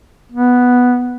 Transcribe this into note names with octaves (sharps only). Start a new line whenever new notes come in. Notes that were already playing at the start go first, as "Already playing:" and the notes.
B3